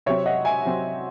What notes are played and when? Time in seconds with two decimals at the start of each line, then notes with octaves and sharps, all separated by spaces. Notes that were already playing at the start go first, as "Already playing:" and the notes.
0.06 C3 F#3 C4 C#5 E5
0.26 D#5 F#5
0.45 E5 G#5
0.65 C3 F#3 C4